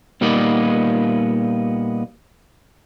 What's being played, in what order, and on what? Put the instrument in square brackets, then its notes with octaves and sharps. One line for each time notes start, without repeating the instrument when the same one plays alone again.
[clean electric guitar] A#2 G3 A#3 B3 D#4 D5